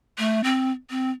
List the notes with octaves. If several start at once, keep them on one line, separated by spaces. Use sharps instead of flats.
A3
C4
C4